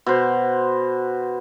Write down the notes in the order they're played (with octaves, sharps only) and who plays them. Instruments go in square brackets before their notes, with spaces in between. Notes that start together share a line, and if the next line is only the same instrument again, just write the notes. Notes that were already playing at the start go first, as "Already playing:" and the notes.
[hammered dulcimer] B2 C5